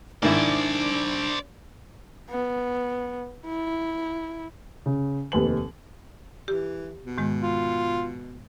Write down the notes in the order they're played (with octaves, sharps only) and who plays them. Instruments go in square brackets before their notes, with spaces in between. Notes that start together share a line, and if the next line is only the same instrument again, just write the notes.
[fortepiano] G#2 D#3 E4 [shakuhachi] D4 [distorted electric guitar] C5 D5
[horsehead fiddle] B3
E4
[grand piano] C#3
F1 D#2 B4 F#7
[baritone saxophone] E3 [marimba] G4
[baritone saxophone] B2
[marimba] G#2 D#3 G#3
[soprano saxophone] F4